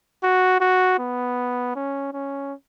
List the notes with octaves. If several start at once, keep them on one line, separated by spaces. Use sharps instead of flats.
F#4
F#4
B3
C#4
C#4